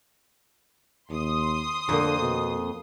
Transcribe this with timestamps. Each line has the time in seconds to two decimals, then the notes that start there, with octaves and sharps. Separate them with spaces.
1.10 D#2 C6 D#6
1.89 F2 D3 A#3
2.21 B2